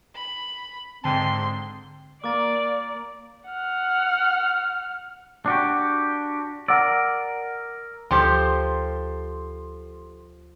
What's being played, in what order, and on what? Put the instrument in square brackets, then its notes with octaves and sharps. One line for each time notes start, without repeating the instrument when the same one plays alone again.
[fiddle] B5
[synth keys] G#2 D3 A5 [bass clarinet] C4 [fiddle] C6
[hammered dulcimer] A#3 [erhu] D5 [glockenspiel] D6 A6
[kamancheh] F#5 F6
[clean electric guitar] D4 F#4 G4
[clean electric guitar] A#4 D5 [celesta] F#5 E6
[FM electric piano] D2 [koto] F3 G4 A4 [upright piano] C6